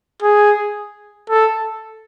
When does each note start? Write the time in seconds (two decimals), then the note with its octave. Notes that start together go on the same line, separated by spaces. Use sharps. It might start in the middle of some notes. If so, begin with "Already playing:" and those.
0.22 G#4
1.30 A4